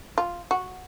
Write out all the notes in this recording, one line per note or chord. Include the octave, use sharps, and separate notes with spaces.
F4
F#4